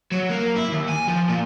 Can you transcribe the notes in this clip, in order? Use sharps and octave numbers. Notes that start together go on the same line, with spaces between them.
F#3
A#3
E4
D#2
G#5
F3
A#2